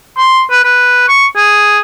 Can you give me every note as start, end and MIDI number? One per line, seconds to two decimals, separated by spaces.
0.18 0.42 84
0.50 0.61 71
0.64 1.06 71
1.08 1.27 85
1.36 1.79 68